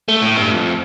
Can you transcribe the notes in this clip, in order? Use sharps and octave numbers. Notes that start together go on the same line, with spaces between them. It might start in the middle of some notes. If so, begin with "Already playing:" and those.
A3
A2
G2
F2